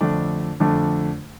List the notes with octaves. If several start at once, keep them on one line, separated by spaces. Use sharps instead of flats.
F2 D3 A3 D4
F2 D3 A3 D4